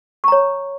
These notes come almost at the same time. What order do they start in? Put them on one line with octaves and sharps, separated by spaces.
C#6 A#5 C#5